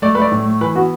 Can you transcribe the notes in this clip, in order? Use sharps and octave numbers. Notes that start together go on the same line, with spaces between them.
A3 D5
A3 B4
D5
A2
A3
E3 B4
B3 F#4